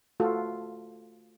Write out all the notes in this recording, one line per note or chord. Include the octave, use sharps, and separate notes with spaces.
A3 F4 F#4 A4